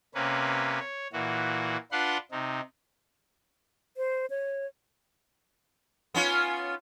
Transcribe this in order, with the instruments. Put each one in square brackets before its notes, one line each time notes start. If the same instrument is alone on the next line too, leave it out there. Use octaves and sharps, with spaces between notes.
[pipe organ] C3 A#3 C#4 B4
C#5
A#2 E3 F#4
D4 F4 B4 F#5 C6
C3 D#4
[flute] C5
C#5
[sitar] B3 C#4 F4